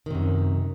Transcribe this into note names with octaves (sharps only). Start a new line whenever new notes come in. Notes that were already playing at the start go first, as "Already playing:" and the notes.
F#2 C3 D#3